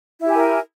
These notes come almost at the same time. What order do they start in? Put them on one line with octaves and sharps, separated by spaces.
E4 G4 G#5 A#4